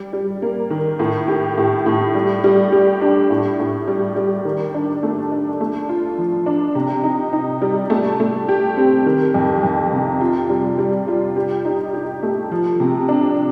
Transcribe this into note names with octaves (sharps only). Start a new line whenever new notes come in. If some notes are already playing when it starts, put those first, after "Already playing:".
Already playing: G3
G3
A#3
D#3
A2
G4
A2
A2
G3
G3
G4
D4
A2
A2
G3
G3
D#3
D4
A3
D4
A3
F4
F3
D4
C3
D#4
D#4
G3
A3
A3
G4
C4
D#3
F2
F2
C3
F4
G3
G3
F4
G4
D#4
G4
A3
F3
C3
D4